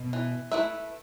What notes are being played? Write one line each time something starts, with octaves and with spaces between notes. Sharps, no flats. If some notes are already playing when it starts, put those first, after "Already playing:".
Already playing: B2
E3
A3 E4 B4 E5